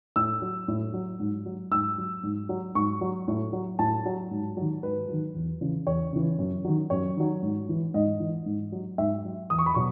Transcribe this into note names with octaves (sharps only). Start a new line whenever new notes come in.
A2 E6
F#3
A2
F#3
G#2
F#3
G#2 E6
F#3
G#2
F#3
G#2 C#6
F#3
A2
F#3
A2 A5
F#3
G#2
D#3 F#3
G#2 B4
D#3 F#3
E2
C#3 E3
E2 C#5
C#3 E3
F#2
D#3 F#3
F#2 C#5
D#3 F#3
G#2
E3
G#2 D#5
E3
G#2
F#3
G#2 E5
F#3
E2 D#6
C#6
B5
B2 F#3 C#6